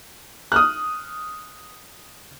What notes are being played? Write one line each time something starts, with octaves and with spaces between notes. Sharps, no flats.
D#6 F6 F#6